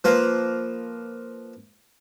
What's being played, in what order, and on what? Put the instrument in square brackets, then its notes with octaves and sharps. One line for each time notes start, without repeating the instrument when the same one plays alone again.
[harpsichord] F3 A#3 B4 C5